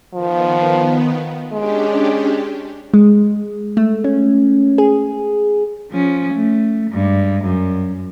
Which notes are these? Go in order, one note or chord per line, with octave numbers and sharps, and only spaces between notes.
D#3 F3 B3
G#3 C#4 D4 G4
G#3
A3
C#4
G#4
F3 C#4
A3
G2 G#3
F#2